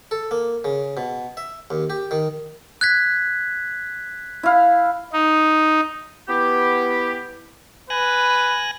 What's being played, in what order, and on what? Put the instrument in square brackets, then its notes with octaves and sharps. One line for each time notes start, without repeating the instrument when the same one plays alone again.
[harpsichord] A4
A#3
C#3
B2
E5
D#2
G4
D#3
[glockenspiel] F#6 G#6 B6
[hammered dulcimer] E4 F5
[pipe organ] D#4
[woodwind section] B3 E4 G4
[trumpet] B4 [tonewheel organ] G#5 F#6 A#6